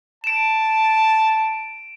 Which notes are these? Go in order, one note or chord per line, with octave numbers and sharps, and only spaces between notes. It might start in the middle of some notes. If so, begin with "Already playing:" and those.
A5 D7 E7